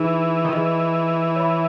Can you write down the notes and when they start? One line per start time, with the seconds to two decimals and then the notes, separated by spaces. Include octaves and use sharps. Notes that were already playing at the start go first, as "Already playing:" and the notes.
Already playing: E3 D#4 G#4 B4
0.45 D#3
0.53 E3 G#4 B4 D#5
1.36 C#5 E5 B5